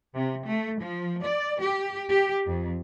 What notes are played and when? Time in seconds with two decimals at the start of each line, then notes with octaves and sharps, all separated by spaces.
0.14 C3
0.46 A3
0.81 F3
1.23 D5
1.63 G4
2.11 G4
2.45 F2